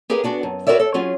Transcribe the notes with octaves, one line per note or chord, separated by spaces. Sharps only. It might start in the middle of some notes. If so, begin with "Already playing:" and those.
G4 G#4 A#4 B4 F5
B3 D4 F#4
F#2
F#4 A#4 B4 C#5 D5 E5
A4
F#3 C#4 F4 G#4